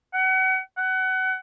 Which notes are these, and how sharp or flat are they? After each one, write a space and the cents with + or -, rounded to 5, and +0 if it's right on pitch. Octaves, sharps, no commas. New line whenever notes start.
F#5 +30
F#5 +25